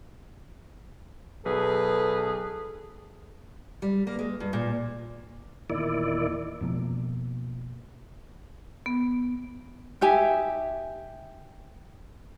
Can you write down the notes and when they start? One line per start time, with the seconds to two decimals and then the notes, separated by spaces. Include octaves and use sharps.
1.45 B1 G#4 A4 B4
3.82 G3
4.07 A#3
4.19 G#3
4.40 G2
4.53 A#2
5.70 E2 A#2 D#3 E4 D5
6.61 F2 B2 F3 A#3
8.86 B3
10.01 D#4 G4 E5 G#5